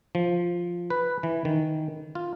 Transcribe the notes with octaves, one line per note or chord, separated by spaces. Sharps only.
F3
B4
E3
D#3
F4